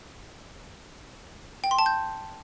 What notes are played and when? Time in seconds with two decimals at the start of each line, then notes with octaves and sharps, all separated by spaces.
1.64 G5
1.71 C6
1.79 A5
1.86 G6